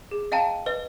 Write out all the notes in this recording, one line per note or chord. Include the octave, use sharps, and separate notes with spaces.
G#4
D#5 F5 G5 A5 A#5
B4 D#5